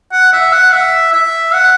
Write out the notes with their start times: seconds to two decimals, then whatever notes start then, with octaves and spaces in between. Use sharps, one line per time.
0.12 F#5
0.33 E5
0.52 F#5
0.72 E5
1.13 E5
1.54 F#5